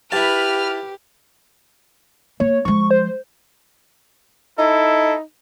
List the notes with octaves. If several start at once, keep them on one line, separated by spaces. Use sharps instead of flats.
E4 G4 B4 A5 F6
A#3 C#5
F3 G#3 C#6
C5
D#4 E4 A4